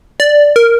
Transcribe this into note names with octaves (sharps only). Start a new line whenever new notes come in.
D5
A#4